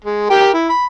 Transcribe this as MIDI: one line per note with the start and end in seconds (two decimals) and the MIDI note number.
0.04 0.29 56
0.30 0.51 67
0.30 0.51 70
0.30 0.51 79
0.54 0.69 64
0.69 0.86 83